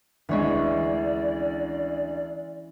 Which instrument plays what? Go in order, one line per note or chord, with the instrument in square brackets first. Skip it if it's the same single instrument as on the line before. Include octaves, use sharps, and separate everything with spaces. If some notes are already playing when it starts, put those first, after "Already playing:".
[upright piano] D2 G#3 [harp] E3 C#4 [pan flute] D5